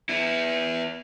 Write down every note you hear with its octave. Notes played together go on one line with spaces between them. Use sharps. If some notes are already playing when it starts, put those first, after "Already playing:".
B3 E4